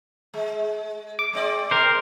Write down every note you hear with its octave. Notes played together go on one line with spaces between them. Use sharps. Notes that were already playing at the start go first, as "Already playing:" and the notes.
G#3
D6
G#3 C4 D5
A#4 C5